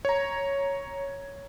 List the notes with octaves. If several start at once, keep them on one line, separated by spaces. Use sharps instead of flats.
C#5 A#5